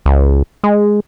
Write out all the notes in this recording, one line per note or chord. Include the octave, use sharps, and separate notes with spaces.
C#2
G#3